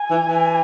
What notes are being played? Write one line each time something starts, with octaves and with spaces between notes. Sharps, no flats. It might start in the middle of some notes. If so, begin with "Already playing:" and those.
Already playing: G#5
E3
E3